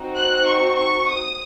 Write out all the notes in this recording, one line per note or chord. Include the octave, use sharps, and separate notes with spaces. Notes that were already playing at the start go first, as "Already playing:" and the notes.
Already playing: C4 D#4 F#4
F#6
C#6
C#6
D#6